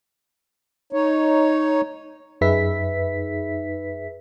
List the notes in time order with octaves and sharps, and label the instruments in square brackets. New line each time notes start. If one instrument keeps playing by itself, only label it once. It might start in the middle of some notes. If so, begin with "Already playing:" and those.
[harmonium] D#4 C#5
[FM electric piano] F#2 D#4 G#4 B4 E5 B6